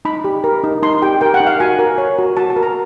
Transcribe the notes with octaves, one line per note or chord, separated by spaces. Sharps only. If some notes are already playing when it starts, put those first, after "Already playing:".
D#4 B5
G4
A#4
D#4
D#4 C6
G4 G5
A#4 G5
F#5
D#4
F5
F#4 G#5
A#4
C#5
F#4
F#4 A5
A5
A#4
A#5